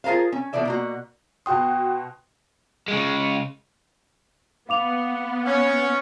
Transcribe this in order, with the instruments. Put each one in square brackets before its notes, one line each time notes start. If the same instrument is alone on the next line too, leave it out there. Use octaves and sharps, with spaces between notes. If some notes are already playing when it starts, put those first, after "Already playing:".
[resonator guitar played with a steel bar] F4 G#4 A#4 C5 F5
C#4
B2 D3 E3 D5 E5
B2 A#3 F#4
[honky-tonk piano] B2 F#4 C6 [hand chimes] G5 D#6
[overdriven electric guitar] C#3 G#3
[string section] B3 [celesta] F5 D6 F7
[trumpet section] C#4